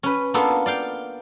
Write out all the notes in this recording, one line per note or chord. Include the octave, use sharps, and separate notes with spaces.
C#4 B4
A#3 B3 D4 F4 A4
D5 F5 G5